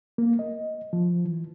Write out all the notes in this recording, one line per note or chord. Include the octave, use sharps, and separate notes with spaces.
A#3
D#5
F3
E3